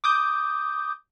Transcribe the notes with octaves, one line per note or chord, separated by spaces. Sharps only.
D6 D#6 G6